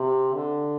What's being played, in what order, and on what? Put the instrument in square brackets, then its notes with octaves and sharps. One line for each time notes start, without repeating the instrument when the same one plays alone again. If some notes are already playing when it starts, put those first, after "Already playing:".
Already playing: [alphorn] C3
D3